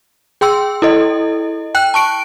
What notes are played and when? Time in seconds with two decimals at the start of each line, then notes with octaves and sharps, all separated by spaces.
0.41 G#4 G5 C6 E6
0.82 E4 A4 D#5
1.75 G5 F#6
1.94 A5 C#6 D7